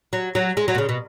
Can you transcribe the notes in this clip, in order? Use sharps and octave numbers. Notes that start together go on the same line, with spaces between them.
F#3
F#3
G#3
F#3
B2
C#3
B2